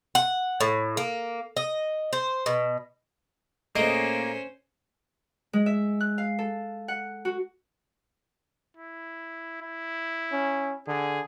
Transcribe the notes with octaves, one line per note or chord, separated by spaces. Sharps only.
F#5
A2
A#3
D#5
C5
B2
A#2 A3 A#3 C#4 G#4 C5 D#5
G#3
E5
F#6
F5
A4
F#5
F#4
E4
E4
C#4
D3 G#4